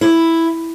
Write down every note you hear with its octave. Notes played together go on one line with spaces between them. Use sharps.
E4